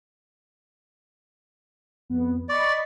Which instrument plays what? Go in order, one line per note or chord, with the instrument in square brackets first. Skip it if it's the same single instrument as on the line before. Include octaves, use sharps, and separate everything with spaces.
[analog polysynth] F2 B3
[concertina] D5 [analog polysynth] D#5 B5 C#6